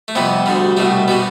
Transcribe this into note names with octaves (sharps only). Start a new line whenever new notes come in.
A3
F2 C3 G3 B3
D2 D3 G3
C2 B2 G3 A3
B2 G3 B3